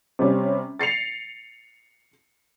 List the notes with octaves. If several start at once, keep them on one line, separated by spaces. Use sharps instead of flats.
C3 G3 C#4
A6 C7 C#7 F7